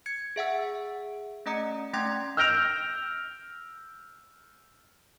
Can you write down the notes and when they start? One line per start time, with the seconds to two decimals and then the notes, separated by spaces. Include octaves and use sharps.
0.06 G#6 C#7
0.36 G#4 E5 F#5 E6
1.46 A3 C#4 D#5 A#5 D#6 C#7
1.94 A3 C#4 G5 C6 G#6
2.37 E6 F6 G6 A#6 D7 F7